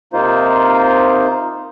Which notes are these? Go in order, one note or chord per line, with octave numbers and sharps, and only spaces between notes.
C3 A#3 D#4 F4 C5